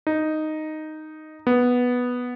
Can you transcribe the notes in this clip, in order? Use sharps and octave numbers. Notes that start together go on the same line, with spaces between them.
D#4
B3